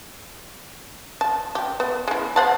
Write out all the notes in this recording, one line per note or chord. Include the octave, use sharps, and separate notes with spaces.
A5
G4
B3
G#3 E4
C5 F#5 A5